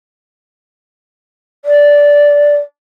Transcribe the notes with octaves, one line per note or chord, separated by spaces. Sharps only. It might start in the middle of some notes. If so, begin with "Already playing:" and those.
D5